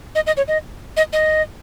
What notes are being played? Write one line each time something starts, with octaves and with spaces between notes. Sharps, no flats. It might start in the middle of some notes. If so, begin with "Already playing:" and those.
D#5
D#5
C#5
D#5
D#5
D#5